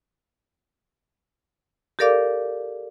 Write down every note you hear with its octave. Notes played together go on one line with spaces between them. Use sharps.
G4 A4 A#4 D5 F5 D6